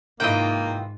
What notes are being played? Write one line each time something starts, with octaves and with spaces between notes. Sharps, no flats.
G#2 C3 D#3 E3 A#3 F4 D#5 G5